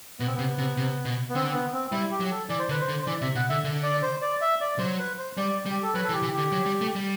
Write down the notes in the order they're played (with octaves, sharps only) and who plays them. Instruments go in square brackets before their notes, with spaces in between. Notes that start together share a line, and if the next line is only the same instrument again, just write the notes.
[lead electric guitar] B2 [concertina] B3
[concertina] C4
[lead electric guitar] C3 [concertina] B3
[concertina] B3
[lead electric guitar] C3
C3
B2
[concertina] B3
[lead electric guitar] D3 [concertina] C4
[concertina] B3
C4
[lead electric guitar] G3 [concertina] E4
[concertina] G4
[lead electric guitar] F#3
[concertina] A4
[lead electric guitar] E3 [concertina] D5
[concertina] C5
[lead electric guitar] D3 [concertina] B4
[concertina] C5
[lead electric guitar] D3
[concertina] C5
[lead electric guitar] E3 [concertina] D5
[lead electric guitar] C3 [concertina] E5
[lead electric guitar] B2 [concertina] F#5
[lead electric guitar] D3 [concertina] E5
[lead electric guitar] D3
[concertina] D5
C5
D5
E5
D5
[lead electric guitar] F#3 [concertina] C5
[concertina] B4
C5
[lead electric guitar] G3 [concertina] D5
[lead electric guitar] G3
[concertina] G4
A4
[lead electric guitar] F#3 [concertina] B4
[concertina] A4
[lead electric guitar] E3
[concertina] G4
[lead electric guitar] E3
[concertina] G4
[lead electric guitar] D3
F#3
G3
A3
G3